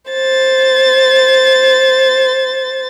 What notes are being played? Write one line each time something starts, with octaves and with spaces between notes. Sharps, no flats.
C5 A6